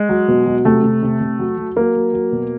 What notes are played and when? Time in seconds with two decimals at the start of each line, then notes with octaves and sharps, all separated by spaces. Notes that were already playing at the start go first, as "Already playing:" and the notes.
Already playing: G#3
0.09 F#3
0.28 B2
0.46 F#3
0.65 C3 A3
0.83 C3
1.03 C3
1.21 C3
1.39 F#3
1.58 F#3
1.76 F#3 A#3
1.95 F#3
2.13 F#3
2.32 B2